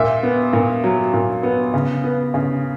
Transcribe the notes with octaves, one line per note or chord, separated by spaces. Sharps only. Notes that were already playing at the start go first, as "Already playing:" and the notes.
Already playing: A#2 E5
B3
A#2
F#3
A#2
B3
C#3
B3
C#3